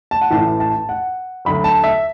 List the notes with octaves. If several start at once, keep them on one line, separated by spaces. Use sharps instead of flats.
A5
F#5
A1 A2 E3 A5
A5
F#5
D2 D3 F#3 B5
A5
E5